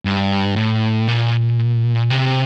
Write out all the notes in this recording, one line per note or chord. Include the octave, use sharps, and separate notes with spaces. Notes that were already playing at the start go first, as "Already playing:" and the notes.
G2
A2
A#2
C3